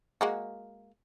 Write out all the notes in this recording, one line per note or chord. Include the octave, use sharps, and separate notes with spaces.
G#3 A#3 F#4